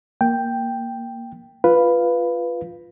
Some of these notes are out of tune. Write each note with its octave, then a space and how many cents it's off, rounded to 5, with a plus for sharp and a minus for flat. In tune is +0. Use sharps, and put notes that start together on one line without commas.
A#3 +0 G5 +0
F4 -5 B4 +0 F5 +0